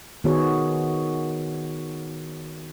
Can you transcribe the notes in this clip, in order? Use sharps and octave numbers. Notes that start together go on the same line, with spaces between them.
D#3 B3 F#4 G#4 C#5